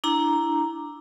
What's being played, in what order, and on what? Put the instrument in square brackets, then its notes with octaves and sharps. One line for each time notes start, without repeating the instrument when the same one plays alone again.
[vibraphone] D4 E4 A#5